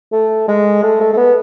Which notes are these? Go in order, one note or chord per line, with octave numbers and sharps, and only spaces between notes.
A3
G#3
A3
A3
A3
B3